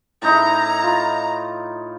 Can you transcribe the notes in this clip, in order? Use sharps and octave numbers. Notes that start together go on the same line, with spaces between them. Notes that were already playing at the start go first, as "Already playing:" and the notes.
A2 D#4 E4 A#5
F4